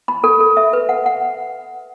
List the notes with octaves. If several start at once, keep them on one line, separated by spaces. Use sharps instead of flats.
B5
A4
A4
E5
B4
F#5
F#5